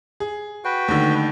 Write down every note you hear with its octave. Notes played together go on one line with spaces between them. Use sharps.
G#4
F#4 B4 F#5 G5
D#2 D3 A3 D#4